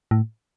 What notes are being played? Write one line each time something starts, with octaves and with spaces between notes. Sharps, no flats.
A2